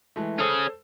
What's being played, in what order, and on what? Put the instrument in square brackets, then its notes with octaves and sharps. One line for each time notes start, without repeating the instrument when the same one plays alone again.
[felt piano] E3 G#3 A3
[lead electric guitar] C#4 G#4 [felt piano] A4 C5